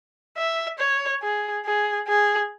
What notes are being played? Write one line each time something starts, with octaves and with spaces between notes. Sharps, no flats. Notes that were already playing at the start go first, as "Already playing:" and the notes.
E5
C#5
G#4
G#4
G#4